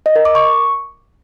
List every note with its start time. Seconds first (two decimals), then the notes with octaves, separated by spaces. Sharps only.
0.06 D#5
0.16 A#4
0.25 D6
0.35 C#6